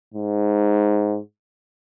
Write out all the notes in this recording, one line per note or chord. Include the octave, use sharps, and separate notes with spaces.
G#2